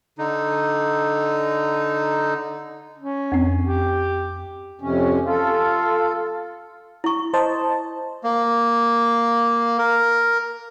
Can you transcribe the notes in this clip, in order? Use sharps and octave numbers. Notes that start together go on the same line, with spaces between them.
D3 D#4
C#4
F2 C4
G4
F2 C3 C#4
F4 A4
E4 C#6
C5 D#5 A5
A#3
A#4